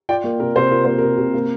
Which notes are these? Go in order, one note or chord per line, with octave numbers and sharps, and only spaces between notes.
F4 D5 G5
A#3
C3 A#4
C3 C5
F4 A#4
A#3 C5
C3 A#4
C3
A#3